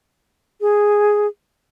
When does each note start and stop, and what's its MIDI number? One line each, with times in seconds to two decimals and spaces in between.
0.61 1.27 68